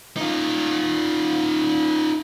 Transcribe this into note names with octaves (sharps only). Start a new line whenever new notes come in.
D#4 F4